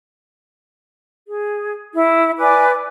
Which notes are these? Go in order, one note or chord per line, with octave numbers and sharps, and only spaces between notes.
G#4
E4
B4 D5 G#5 D6